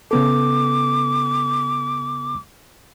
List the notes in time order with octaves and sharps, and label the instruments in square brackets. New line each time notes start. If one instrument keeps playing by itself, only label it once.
[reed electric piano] C#3 B3 A4 [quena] D6